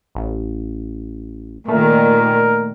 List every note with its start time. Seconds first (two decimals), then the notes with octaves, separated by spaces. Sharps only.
0.15 A1
1.68 A#2 D#3 A3 A#4